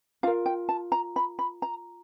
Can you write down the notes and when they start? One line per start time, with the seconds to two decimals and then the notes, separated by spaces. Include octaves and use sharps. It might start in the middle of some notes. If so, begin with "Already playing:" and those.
0.23 F4 A#4 F5
0.46 G5
0.69 A5
0.92 A#5
1.16 B5
1.39 B5
1.62 A#5